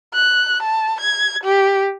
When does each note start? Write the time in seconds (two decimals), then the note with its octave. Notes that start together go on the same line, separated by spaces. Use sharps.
0.14 F#6
0.63 A5
1.01 G#6
1.44 G4